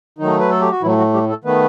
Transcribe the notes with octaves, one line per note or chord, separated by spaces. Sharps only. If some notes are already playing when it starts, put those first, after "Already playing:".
D#3 F#3 A3 D#4
B4
A4
G4
F#4
A2 E3 F#3 A3 E4
F#3 F#4
G3 G4
A3 A4
D#3 A3 B3 B4